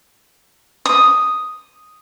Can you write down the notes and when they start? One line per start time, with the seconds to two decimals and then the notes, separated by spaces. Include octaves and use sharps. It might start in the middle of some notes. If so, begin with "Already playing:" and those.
0.85 D#6